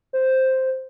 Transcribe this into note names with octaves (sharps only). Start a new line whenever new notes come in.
C5